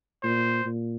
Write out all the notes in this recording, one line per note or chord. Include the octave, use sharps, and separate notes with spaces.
A#2 C5
A#2